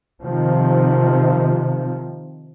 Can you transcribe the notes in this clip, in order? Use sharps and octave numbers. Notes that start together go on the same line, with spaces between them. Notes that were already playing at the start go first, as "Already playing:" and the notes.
C3 D#3 F3